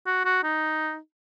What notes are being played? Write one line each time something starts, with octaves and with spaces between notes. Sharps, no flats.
F#4
F#4
D#4